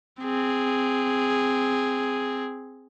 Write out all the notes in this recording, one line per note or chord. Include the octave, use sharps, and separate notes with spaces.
C4 G#4